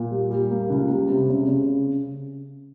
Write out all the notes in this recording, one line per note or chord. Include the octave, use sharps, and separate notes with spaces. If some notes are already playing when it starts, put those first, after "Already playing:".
Already playing: A#2
G3
G3
A#3
C#2
G3
C3
C#3
C#3